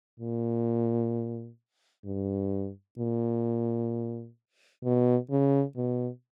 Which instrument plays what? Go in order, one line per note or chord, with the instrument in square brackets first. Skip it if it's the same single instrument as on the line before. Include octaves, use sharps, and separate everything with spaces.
[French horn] A#2
G2
A#2
B2
C#3
B2